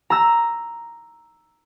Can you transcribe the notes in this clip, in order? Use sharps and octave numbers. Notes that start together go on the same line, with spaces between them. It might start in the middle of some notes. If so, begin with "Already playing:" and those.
A#5 E6 A#6